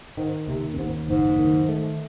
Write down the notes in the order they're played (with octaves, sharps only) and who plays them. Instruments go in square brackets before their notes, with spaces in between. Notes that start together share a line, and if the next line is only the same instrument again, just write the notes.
[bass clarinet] G#2 [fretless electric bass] D#3
[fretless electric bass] D#2 [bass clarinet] C3
[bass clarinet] F#2
[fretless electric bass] D#2 [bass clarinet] G#2
[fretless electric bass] F#1 [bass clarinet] G#2
[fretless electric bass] D#3
A3